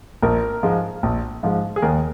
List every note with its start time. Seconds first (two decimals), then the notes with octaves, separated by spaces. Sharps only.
0.23 A#1 A#4
0.63 G#2 F3 G#3
1.03 A#1
1.43 G#2 F3 G#3
1.76 G#4
1.82 D#2 A#4